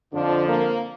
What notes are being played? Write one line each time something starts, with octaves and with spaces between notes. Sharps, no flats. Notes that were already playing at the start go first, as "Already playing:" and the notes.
F2 D3 F3 D4
A#3